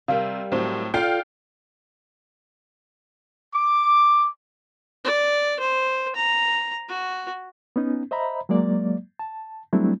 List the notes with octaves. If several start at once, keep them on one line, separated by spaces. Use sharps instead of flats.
C3 G3 A#4 F5
A2 F#3 C4
F4 A4 D5 F5 G5
D6
D5
C5
A#5
F#4
B3 C#4 D#4
C5 D#5 E5 A#5 B5
F#3 G#3 A#3 D5
A5
F#3 G3 A3 C4 D4 E4